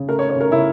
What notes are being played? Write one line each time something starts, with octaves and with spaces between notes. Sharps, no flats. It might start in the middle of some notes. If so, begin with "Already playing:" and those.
Already playing: C#3
A3 A#4
C#5
A3
C#5
C#3 A#4
C#3 E4